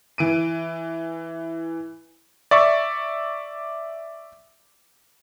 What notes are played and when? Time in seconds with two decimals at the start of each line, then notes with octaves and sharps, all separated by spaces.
0.18 E3 D7 D#7
2.51 D5 E5 C#6